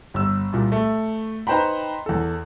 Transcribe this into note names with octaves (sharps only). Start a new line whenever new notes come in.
G1 E6
C2 A#2
A3
D#4 B4 C5 G5 A#5 B5
E2 A4